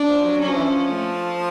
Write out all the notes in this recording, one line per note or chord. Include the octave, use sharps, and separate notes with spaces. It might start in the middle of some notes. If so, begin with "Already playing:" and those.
Already playing: D4
F3
F#3
F#3 C#4
F3
E3
F3
A3